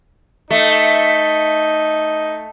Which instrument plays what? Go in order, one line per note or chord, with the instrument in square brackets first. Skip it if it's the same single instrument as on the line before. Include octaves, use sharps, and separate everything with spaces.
[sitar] A3 [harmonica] D#4